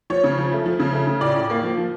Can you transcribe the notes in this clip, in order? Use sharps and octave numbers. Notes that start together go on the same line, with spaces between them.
F3 C#5
C#3
F3
A3
F3
C#3
A3
C#3
A2 D5
A2
A#3
F3
F3